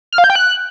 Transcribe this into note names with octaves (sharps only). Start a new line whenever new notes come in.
F6
F5
G6
G5
F#6